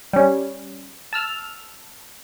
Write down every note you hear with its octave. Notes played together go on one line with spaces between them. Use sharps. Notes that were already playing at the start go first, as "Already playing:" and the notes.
G3 C#4
A5 E6 F6